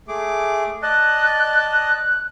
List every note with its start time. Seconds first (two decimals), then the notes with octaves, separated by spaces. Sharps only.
0.08 A3 G#4 D6
0.83 D5 D#5 A5 F#6